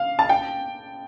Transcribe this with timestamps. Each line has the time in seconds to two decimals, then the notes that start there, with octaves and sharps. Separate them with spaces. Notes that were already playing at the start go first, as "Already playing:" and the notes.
Already playing: F5
0.19 A5
0.29 G5